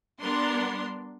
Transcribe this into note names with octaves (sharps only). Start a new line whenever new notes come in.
G3 B3 D4 A#4 C6